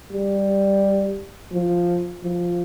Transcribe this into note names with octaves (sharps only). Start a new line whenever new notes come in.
G3
F3
F3